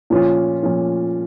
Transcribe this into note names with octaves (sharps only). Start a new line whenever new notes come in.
A#2 F3 C#4 F4
A#2 F3 C#4 F4